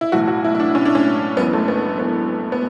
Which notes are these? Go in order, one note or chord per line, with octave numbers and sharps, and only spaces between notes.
E4
B1 A2 E3 F#4
F#4
E4
E4
D4
C#4
D4
C#4
F#1 F#2 E3 B3
A3
B3
B3
B3